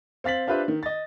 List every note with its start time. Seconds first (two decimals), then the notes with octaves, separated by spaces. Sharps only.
0.24 C4 F5 A6 B6 F#7
0.47 D4 F4 G4 B4 C5 E5
0.68 D#3
0.83 D#5 A6